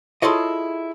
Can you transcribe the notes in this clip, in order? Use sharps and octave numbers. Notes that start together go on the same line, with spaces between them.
E4 F4 G#4 A4 C#5 D#5